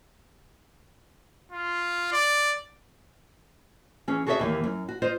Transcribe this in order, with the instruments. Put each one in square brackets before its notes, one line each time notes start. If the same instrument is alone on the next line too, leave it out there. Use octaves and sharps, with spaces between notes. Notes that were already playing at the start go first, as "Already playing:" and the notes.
[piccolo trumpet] F4
D5
[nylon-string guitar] E3 C#4 G#4
F#4 G#4 A4 C#5 D#5 E5
D#2 E3 A#3
F#2
F#4
F4 C5 D#5